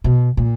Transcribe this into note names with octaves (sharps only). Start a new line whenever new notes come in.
B2
A#2